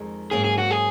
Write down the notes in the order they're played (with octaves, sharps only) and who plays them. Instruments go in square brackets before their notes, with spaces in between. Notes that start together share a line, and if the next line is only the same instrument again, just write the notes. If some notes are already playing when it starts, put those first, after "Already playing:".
Already playing: [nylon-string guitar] F2 D#3 G#3
[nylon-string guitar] G#2 F#3 A#3 C#4 [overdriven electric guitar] G#4
[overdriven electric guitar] G#4
F#4
G#4